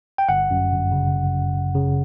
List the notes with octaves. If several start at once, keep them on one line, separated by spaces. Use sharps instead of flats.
G5
G1 F#5
F#2
G1
C#3
G1
F#2
G1
C#3